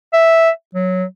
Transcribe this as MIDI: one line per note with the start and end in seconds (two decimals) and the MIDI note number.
0.13 0.50 76
0.74 1.05 54